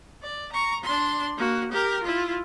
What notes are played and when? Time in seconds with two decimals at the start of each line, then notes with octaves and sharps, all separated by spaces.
0.22 D5
0.52 A#5 C#6
0.84 D4 C6
1.37 A#3 F#4
1.72 G4 A#4
2.03 E4 F4